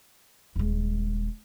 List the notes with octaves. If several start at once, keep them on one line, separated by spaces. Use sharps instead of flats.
D#1 G#3